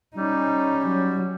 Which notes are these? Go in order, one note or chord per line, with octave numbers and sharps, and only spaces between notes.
G3 C#4 D#4
F#3